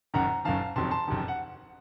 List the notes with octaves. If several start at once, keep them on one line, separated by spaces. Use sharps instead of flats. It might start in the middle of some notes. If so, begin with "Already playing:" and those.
F#1 F#2 D#3 F#5 A#5
F#1 F#2 D#3 F5 A5
F#1 F2 C3 D#3 F#3 A5 C6
A5 C6
F#1 F2 C3 D#3 F#3
F#5